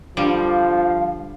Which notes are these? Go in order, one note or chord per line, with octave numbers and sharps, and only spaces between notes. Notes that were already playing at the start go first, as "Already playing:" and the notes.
D3 F3 G3 F5